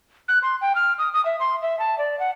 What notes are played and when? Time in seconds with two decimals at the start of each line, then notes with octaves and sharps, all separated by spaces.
0.28 F#6
0.42 C6
0.61 G5
0.75 F6
0.99 D#6
1.13 D#6
1.25 E5
1.40 C6
1.62 E5
1.79 A5
1.98 D5
2.19 F#5